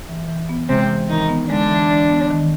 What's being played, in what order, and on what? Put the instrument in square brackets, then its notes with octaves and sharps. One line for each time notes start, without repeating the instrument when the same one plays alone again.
[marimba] E3
E3
B3
[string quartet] C3 C4 [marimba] G#3
[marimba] E3
[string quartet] D#3 D#4 [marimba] E3
[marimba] B3
[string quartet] D3 D4 [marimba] G#3
[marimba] E3
E3
B3
D#3